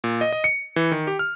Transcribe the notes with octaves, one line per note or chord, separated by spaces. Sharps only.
A#2
D#5
D#5
C#7
E3
D#3
G4
F6